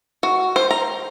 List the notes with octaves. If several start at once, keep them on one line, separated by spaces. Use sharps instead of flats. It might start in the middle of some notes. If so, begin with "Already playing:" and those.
F#4
C5
A#5